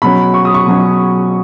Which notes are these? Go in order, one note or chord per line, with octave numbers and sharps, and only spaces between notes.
B2 F#3 C#4 B5
C#6
D#6
C#6
B2 F#3 C#4